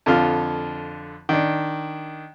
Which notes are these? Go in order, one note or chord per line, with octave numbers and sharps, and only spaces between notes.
F2 D3 F4 F6
D#3 D4